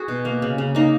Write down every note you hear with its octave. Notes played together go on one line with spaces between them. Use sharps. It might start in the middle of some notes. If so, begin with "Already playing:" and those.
Already playing: F#4 G#4
B2
A#3
C#3
C#3
A#3 D#4